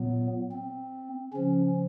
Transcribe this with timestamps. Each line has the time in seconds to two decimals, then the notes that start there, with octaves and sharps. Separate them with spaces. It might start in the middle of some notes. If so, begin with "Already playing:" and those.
Already playing: A#2 F#3 B3
0.52 C4
1.33 C#3 F3 C#4